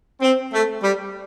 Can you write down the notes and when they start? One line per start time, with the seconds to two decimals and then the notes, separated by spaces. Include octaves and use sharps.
0.21 C4
0.51 A3
0.82 G3